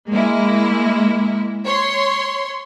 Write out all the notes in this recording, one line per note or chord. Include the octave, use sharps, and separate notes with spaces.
G#3 A#3 E4
C#5 C6